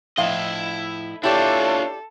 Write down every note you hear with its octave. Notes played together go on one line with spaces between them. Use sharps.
A2 F3 E4 D#5 F5
D4 E4 F4 G4 A4 C#5 D5